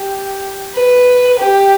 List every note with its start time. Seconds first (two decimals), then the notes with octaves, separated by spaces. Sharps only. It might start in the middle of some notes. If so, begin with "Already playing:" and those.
Already playing: G4
0.75 B4
1.38 G4